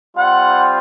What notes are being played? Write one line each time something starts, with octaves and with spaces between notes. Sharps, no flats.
G3 C4 F4 F#5